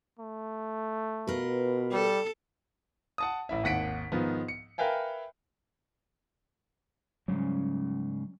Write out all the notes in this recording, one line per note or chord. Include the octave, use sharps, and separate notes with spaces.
A3
B2 F4 A#4 B4
G3 A4
F#5 A5 D#6
A1 E4 E5
G#1 D#2 F#5 B6 D7
G#2 D#3 F3 B3
C#7
A#4 B4 E5 F5 G5 G#5
G#2 C#3 F#3 G3 C#4